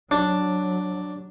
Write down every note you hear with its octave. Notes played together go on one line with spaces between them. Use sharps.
F#3 D4